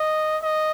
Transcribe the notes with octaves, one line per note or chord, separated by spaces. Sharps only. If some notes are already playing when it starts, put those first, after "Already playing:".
Already playing: D#5
D#5